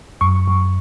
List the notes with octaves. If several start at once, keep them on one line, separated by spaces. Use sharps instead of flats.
F#2 C#6
F#2